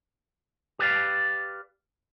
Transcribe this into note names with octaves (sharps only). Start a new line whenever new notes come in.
G4 B4 D5 F5